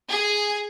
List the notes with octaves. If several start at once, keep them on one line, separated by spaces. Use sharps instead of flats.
G#4